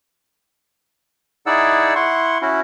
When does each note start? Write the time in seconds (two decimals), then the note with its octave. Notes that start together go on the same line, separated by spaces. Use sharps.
1.46 D#4 E4 G#4 D5 F#5 E6
1.95 E4 F#5 C6 C#6
2.42 C#4 E4 F#4